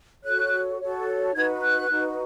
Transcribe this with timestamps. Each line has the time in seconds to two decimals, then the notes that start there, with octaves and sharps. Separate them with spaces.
0.24 F#4 A4 C#5 F#6
0.80 F#4 A4 C#5
1.35 D#4 F#4 B4 G#6
1.62 F#6
1.90 D#4 F#4 B4